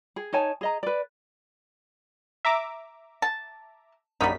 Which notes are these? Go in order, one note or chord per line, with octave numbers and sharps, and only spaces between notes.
G#4
D#4 C#5 G#5 A5
G#4 D#5 A#5
B4 D5
E5 A#5 D6
A5
A#1 F#2 G3 D#4 B6